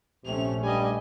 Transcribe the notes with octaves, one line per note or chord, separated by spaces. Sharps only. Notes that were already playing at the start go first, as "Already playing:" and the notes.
A#1 C3 A3 C#4 F7
G2 G3 D#5 G#5